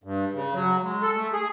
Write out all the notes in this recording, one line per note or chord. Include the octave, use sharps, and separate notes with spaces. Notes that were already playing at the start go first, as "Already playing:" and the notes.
G2
C#3
F#3
G#3
A4
A3
G#4